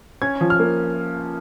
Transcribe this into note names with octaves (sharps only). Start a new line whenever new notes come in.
C#4 G#6
F3
F6
A#3